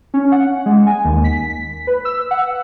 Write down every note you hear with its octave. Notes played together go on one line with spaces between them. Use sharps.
C#4
F#5
G#3
G#5
D#2
B6
B6
B4
E6
F#5